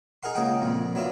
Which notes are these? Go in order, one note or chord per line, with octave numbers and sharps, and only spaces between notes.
D#4 G#4 A#4 F#5 C6
C#2 C#3 A#3 D#5 F#5 G5
F2 A#2
F#3 B3 D4 E4 F4